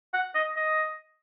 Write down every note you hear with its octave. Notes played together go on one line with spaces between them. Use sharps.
F#5
D#5
D#5